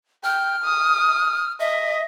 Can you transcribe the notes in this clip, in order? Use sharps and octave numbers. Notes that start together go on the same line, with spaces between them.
G5 F6
D#6
D#5 E5